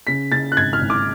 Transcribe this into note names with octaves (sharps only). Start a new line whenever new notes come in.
C#3 B6
C#3 A6
F#6
G#1 G#6
F6
G#1
D6